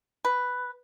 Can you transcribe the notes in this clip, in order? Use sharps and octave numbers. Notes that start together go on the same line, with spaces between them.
B4